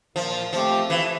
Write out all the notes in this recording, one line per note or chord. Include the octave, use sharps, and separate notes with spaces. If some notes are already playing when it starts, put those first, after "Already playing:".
A#2 F3
F3 A3 C4 G4
E3 F3